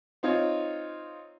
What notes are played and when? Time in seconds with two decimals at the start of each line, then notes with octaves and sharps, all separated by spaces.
0.23 C4 D#4 F4 C#5